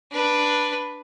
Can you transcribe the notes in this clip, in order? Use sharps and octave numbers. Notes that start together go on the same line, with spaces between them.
D4 B4